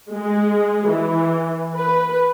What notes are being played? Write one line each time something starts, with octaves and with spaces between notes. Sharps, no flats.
G#3
E3
B4